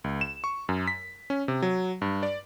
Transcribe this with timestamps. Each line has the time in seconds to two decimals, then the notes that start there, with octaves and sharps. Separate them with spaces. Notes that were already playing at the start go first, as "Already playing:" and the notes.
0.04 C#2
0.21 E7
0.44 C#6
0.69 F#2
0.88 B6
1.30 C#4
1.48 C3
1.62 F#3
2.02 G2
2.23 D5